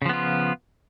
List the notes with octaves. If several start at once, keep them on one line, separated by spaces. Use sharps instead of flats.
C#3 F3 B3 F4